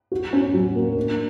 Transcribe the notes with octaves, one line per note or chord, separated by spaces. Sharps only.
F#4
C#4
F#3
A#3
D4